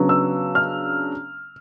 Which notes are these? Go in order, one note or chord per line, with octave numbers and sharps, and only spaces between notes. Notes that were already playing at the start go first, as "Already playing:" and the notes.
Already playing: C#3 F#3 B3 D4
E6
F6